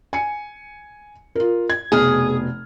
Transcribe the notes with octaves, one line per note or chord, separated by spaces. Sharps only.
G#5 C#7
F4 A#4
G#6
F1 B2 G#4 F6